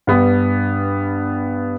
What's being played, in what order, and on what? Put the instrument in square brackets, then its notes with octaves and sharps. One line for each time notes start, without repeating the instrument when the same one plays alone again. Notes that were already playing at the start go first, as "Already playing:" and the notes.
[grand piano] G2 B3